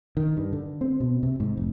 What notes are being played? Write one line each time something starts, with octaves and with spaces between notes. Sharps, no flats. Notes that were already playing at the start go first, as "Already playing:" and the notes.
D#3
G2
D3
C4
B2
C3
G#2
F1